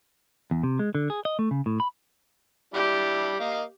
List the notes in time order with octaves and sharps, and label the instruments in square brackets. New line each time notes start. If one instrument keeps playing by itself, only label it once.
[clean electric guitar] E2
C3
G#3
D3
G#4
D#5
A3
C#3
A2
B5
[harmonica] G3 D4 E4 [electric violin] G4
[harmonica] A#3 D#5 F5